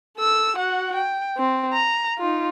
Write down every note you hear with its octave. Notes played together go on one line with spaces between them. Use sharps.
A4 E6
F#4 F#5
G5
C4
A#5
D#4 F4